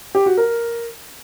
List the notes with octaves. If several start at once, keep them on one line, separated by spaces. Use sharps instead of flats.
G4
F#4
A#4